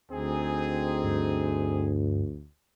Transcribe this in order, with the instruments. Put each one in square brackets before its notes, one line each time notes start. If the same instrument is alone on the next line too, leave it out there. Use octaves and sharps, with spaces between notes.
[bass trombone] D2 [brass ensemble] C4 D#4 G#4
[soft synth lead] G2